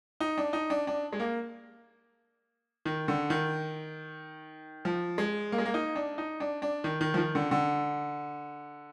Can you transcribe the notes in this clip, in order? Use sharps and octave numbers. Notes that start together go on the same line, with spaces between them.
D#4
D4
D#4
D4
D4
G#3
A#3
D#3
D3
D#3
F3
G#3
A#3
G#3
A#3
D#4
D4
D#4
D4
D4
D#3
D#3
F3
D#3
D3
D3